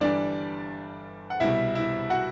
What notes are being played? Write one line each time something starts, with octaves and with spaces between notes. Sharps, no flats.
G1 G2 E3 G3 D4 D5
F#5
C2 B2 G3 E4 E5
E4 E5
F#4 F#5